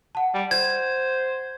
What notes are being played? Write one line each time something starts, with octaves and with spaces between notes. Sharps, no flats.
F#5 A5
G3
C5 G#6